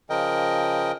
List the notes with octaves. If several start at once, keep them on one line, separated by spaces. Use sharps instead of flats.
C#3 F3 A#4 D#5 G5